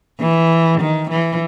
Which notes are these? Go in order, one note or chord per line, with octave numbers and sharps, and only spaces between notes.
E3
D#3
E3